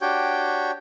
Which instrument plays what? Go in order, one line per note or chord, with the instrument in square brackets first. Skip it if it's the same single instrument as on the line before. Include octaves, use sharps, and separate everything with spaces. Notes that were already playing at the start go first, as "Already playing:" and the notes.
[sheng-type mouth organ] D4 F#4 G4 C#5 G5